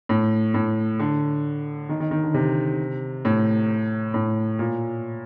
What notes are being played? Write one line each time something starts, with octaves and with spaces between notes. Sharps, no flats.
A2
A2
D3
D#3
D#3
D#3
D3
C3
A2
A2
A#2